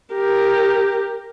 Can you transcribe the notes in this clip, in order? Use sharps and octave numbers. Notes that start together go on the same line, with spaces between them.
G4 A#4